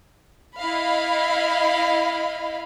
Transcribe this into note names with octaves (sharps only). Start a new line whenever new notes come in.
E4 D#5 F5 B5